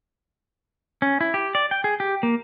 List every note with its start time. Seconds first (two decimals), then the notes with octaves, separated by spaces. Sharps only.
1.02 C#4
1.21 E4
1.34 G4
1.55 D5
1.71 G5
1.84 G#4
2.00 G4
2.23 A#3